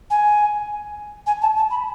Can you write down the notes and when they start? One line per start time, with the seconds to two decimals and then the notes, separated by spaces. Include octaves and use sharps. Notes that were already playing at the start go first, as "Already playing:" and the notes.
0.10 G#5
1.27 G#5
1.42 A5
1.56 A5
1.70 B5